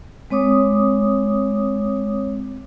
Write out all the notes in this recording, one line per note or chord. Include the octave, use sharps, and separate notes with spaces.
G#3 C4 C#5 D6 D#6